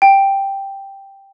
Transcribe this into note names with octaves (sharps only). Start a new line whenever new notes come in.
G5